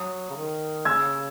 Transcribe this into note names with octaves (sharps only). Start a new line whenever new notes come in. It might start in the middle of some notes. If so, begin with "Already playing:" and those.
Already playing: F#3 D#6
C#3
D#3
C#3 E6 G#6